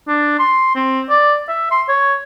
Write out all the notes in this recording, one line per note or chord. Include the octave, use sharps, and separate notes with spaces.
D4
C6
C4
D5
E5
C6
C#5